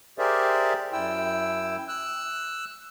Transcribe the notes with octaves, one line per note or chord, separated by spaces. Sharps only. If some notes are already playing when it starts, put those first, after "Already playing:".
G4 G#4 A#4 C5 D5 E5
F#2 E4 G5 E6
E6 F#6